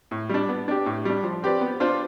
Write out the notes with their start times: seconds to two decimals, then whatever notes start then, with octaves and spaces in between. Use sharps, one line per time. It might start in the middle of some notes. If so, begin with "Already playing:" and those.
0.11 A2
0.29 G3 D4
0.49 B3
0.68 D4 G4
0.86 A2
1.05 G3 D4
1.24 F3
1.43 C4 G4 B4 D5
1.61 B3
1.80 D4 F4 C5